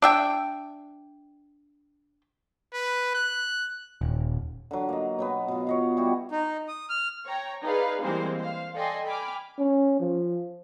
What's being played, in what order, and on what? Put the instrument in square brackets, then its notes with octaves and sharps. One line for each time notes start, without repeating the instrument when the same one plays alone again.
[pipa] D4 E5 G5
[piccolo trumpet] B4
F#6
[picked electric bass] D#1
[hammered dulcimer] D3 F#3
A#3 D#5
B2 F#3 B3
B2 F4
C#5 D#5 F5
G3 E4 F#4 G4
[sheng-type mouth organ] D#4
D#6
F6
[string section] C#5 G5 A#5
D#4 G#4 B4 D5 F5
E3 G3 G#3 A#3 C4 C5
C5 F5
A4 D5 D#5 G5 G#5 C6
G5 G#5 B5 D6 F6
[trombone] C#4
F3